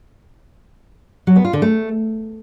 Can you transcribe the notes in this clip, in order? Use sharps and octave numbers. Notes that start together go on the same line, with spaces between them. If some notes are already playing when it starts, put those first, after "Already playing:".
F#3
B3
F4
D3
A3